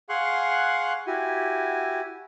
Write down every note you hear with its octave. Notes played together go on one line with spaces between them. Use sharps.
G#4 F5 F#5 C6 C#6 F#6
E4 F#4 G4 G#5